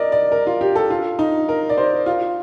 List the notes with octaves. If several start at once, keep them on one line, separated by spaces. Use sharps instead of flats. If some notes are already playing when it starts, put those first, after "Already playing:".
Already playing: A#4 D5 D#5
D5
A#4
F4
G4
A4
F4
D#4
A#4
D5
C5
F4